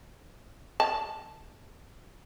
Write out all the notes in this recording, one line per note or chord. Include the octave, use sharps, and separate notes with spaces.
A5